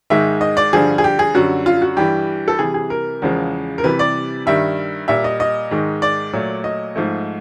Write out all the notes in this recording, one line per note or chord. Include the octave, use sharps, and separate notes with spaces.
G#2 D#3 G#3 E5
D#5
D5
G2 D3 F3 G#4
G#4
G4
G#4
F#2 D3 G3 F#4
F4
F#4
G2 E3 G3 G4
A4
C3 E3 G3 G#4
G#4
A#4
E2 C#3 F3 G#3
A#4
C3 E3 G3 B4
D5
G2 D#3 G3 E5
A#2 G3 E5
D#5
D#5
G#2 D#3 G#3
D5
A#2 F#3 A3
D#5
G#2 F3 A3